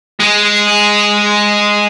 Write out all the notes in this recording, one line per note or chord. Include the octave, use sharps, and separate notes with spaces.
G#3